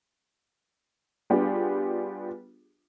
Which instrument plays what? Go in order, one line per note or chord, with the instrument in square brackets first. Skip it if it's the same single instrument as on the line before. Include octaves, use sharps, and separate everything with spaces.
[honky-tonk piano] G3 B3 D4 F4 G4 G#4